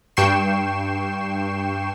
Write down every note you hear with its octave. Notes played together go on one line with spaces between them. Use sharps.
G2 G5 C#6 C7 E7